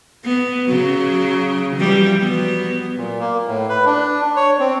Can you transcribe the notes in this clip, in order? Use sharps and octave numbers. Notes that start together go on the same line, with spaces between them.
B3
C#3 F#3
E3 F3 G3
F#3 B3
A#2
A#3
A2
B4
D4
C#5
C4